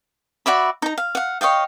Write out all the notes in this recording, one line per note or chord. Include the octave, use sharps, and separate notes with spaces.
F#4 D5 E5 B5
D#4 A#5
F5
F5 F#5
C#5 D#5 F5 G5